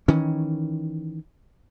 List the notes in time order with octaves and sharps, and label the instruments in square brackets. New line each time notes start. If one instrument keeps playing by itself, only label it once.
[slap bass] D#3 E3 C#4